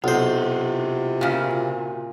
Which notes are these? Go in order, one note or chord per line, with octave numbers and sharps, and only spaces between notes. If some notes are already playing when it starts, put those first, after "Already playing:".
B1 C3 F4 F#4 C5
A#2 C#3